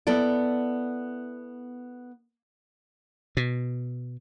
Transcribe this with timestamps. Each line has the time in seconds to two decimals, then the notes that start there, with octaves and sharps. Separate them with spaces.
0.07 B3 E4 A4 D5
3.37 B2